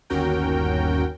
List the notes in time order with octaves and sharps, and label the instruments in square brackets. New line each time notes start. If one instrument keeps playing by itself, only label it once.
[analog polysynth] G1 D#2 C#4 F#4 A#4 G5